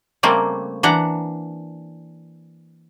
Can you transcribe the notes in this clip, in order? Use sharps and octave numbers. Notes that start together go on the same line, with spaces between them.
C#3 G3 A3 A#3 C4
E3 D4 F#5 A#5